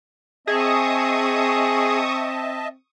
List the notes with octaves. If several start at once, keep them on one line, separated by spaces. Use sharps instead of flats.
C4 G#4 D#5 E5 A5 C#6 D#6